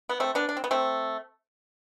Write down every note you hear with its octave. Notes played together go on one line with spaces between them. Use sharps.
B3
A3 C4
B3 D4
D4
C4
B3
A3 C4